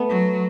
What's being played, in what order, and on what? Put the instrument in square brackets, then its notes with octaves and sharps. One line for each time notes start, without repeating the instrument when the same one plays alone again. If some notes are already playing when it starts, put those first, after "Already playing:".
Already playing: [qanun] A3 B3
[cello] F#3